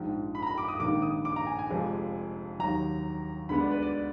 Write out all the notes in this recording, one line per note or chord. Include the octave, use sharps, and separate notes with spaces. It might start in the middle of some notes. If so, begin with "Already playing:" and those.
Already playing: A#1 G#2 F3
B5
A#5
B5
D6
D#6
A#1 G#2 D#3 A#3 D6
D#6
D6
A#5
G#5
G#5
F1 F2 F3 G#3
D#2 D#3 F#3 A#5
D2 D3 G#3 B3 B5
D5
B4
D5